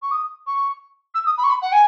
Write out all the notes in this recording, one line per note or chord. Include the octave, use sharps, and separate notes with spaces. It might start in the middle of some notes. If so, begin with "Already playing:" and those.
C#6
D#6
C#6
E6
D#6
B5
C#6
B5
F#5
G#5